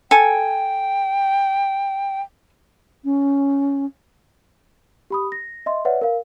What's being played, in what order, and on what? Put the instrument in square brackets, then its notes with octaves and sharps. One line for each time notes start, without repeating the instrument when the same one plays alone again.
[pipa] A4 G#5 [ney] G5
[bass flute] C#4
[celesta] G4 B5 D#6
A#6
D#5 E5 C6
B4 C#5 D5 E5 F#5
A#4 F5